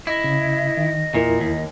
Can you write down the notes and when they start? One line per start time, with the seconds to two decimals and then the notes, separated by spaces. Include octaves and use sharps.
0.07 E4 D#5
0.24 C#3
0.77 D#3
1.14 E2 A#2 E4 A#4
1.40 D#2